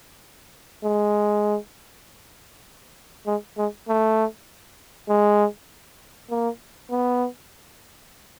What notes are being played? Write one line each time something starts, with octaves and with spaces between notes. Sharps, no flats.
G#3
G#3
G#3
A3
G#3
A#3
B3